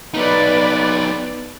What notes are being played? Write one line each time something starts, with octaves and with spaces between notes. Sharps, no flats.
B3 D#4 B4 D5